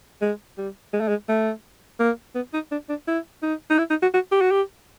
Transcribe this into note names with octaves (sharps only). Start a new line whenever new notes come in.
G#3
G3
G#3
A3
G#3
A3
A#3
B3
D#4
D4
D4
E4
D#4
D#4
E4
D#4
F#4
F#4
G4
F#4
G4